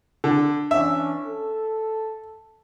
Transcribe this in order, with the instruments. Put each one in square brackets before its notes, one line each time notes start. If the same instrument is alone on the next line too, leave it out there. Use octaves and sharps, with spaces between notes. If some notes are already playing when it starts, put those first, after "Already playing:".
[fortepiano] D3
[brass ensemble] E3 C#4 D4 [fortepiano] E5
[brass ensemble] A4